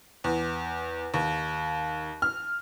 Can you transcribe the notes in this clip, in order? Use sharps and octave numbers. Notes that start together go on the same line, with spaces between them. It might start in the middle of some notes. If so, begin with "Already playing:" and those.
E2
D#2
F6